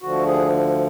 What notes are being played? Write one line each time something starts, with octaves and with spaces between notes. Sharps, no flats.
D2 D3 F3 F#4
G#4